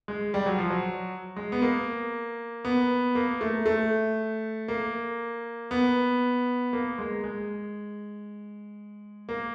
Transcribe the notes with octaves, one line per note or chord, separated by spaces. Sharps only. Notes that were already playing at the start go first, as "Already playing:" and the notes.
G#3
G3
F#3
F3
F#3
G#3
B3
A#3
B3
A#3
A3
A3
A#3
B3
A#3
G#3
G#3
A#3